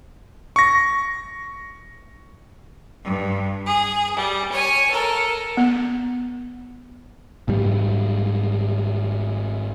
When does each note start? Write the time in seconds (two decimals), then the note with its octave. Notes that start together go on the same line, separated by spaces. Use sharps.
0.56 C#6 A#6
3.04 G2
3.67 G#4
4.16 G3
4.52 C#5 G#5
4.90 A4 A#4
5.57 B3
7.48 G#1 G#2 G3